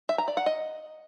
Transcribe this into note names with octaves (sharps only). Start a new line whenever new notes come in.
E5
A#5
D5
F#5
D#5